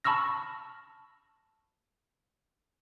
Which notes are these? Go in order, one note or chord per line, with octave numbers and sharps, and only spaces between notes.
A5 B5 C#6 E6 F6 A#6